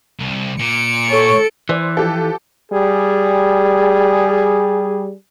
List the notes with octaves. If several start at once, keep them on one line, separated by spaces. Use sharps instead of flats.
C2
A#2 C#7 D7
A4 C#5 C#6
E3 C5 D5
F3 G4 A4
G3 G#4